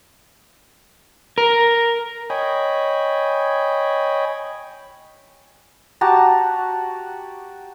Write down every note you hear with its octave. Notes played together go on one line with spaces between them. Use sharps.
A#4
C#5 D#5 G5 G#5 B5
F#4 G4 A5 A#5